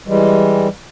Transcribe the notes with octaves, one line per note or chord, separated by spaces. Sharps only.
E3 G3 G#3